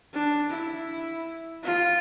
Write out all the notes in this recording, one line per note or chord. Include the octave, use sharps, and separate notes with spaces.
D4
E4
F4